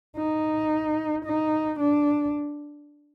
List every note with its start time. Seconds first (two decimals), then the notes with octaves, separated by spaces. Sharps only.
0.17 D#4
1.25 D#4
1.80 D4